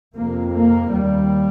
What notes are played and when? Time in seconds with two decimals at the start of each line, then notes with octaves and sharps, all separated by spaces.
0.15 F2 C3 A#3
0.54 A#3
0.92 D#2 G3